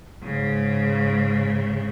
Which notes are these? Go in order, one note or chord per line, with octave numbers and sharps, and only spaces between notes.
G#2 C#3